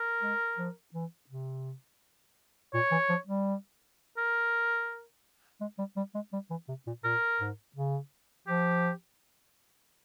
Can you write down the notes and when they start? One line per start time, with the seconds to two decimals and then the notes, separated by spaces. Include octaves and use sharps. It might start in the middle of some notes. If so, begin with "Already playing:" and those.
Already playing: A#4
0.22 G#3
0.58 F3
0.94 E3
1.29 C3
2.74 A#2 C#5
2.91 E3
3.09 F3
3.28 G3
4.18 A#4
5.61 G#3
5.78 G3
5.97 G3
6.14 G#3
6.33 G3
6.50 E3
6.68 C3
6.87 A#2
7.04 A#2 A#4
7.40 G#2
7.76 C#3
8.47 F3 G4